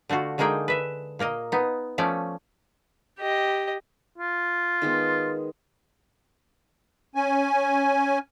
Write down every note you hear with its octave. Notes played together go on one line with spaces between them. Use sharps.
D3 A3 F4 F#4
D3 G#3 A#3 D#4 G#4 G5
B4 E5
A#2 A#3 A#4 D#5
B3 D#4
F3 A3 C#4 D5
G4 D#5
F4
D#3 G#3 B3
C#4 G#5